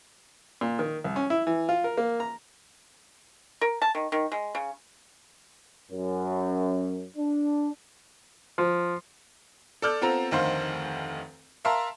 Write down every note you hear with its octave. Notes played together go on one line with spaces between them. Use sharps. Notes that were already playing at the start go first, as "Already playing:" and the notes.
A#2
D#3
C2
C#4
E4
E3
F4
A#4
A#3
A#5
A#4
A5
D#3
D#3
G#3
C#3
F#2
D4
F3
A4 D5 F6 G6
B3 C4 F4 A4 C5 A#5
F1 D2 D#3 C5 F5 C6
A#4 E5 F5 A5 A#5 C6